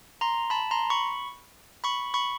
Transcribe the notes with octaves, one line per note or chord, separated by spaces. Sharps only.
A#5 C6
A5 B5
A#5 C6
B5 C#6
B5 C#6
B5 C#6